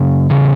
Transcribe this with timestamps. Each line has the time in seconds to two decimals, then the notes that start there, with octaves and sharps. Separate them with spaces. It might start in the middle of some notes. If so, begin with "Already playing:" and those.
Already playing: F#2 C#3
0.30 E2 C#3